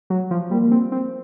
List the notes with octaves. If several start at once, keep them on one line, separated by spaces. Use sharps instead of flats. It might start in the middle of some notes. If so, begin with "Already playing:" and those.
F#3
F3
G3 A#3
C4
C4